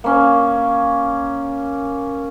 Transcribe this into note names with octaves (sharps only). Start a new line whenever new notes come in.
A#3 C#4